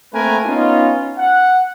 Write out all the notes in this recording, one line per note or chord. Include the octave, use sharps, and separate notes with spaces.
A3 A#3 C4 A#4 B4 G#5
B3 C#4 D#4 F4
F#5